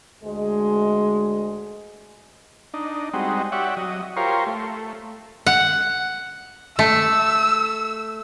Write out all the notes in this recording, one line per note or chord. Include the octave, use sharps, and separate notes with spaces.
D2 G#3
D4 D#4
G3 G#3 C4 D#4 F#4
G4 C#5 D5 E5 F#5
F#3 D#5
F4 G4 A#4 C5 C#5
A3
F#5
A3 E6